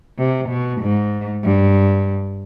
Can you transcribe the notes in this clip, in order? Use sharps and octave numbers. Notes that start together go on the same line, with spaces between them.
C3
B2
G#2
G2